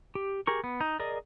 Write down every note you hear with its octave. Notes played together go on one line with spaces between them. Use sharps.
G4
G4 G#4 A#4 C#6
B3
D#4
G#4 A#4 D5 D#5